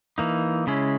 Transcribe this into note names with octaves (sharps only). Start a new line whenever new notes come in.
E3 A#3 D#4
C#3 G#3 C#4 E4